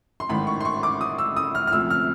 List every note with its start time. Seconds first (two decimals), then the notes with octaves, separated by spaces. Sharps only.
0.20 C6
0.29 A1 G#2 D#3 B5
0.47 C#6
0.61 C6
0.65 C#6
0.83 D6
1.01 D#6
1.18 E6
1.36 D#6
1.55 F6
1.67 F6
1.72 D2 C3 F3 E6
1.90 F6